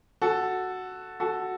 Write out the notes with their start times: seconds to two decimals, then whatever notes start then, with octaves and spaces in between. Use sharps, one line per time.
0.22 F#4 A4
1.20 F#4 A4